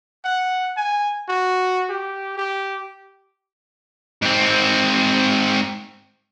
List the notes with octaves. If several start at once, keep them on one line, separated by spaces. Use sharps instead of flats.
F#5
G#5
F#4
G4
G4
G#2 C4